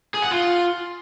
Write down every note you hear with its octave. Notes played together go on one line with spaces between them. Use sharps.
G#4
F#5
F4